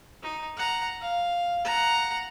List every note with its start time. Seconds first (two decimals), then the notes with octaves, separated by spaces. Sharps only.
0.23 D#4
0.57 F#5 A#5
1.01 F5
1.65 F#5 A#5